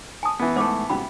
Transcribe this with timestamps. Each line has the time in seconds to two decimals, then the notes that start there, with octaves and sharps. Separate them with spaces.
0.23 G#5 A5 D#6
0.40 E3 B3
0.56 G#2 A3 C5 D6
0.90 C2 G#2 C#4 F#4 B5